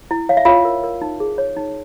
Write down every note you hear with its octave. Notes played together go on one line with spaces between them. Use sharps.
E4
C#5 F5
E5
F4 C#5 F5
A#4
A#4
D#4
G#4
C#5
D#4